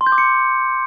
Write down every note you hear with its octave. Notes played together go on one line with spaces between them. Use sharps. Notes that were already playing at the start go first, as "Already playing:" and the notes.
C6
G6
D6
C#7